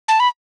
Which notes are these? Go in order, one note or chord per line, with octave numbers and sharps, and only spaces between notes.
A5
B5